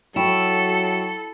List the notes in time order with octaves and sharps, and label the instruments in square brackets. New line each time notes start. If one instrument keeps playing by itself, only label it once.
[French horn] F#3 [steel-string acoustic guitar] E4 [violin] A4 [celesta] G5 C#6 E7